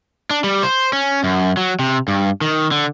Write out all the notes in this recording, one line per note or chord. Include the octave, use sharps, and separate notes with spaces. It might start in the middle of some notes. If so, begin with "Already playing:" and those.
D4
G3
C5
C#4
F#2
F#3
C3
G2
D#3
D3